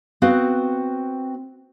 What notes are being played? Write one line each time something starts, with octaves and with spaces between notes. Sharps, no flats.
B3 C4 F#4 B4 F5